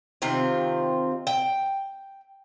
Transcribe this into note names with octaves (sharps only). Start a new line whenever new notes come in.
C3 D#3 C4 F4
G5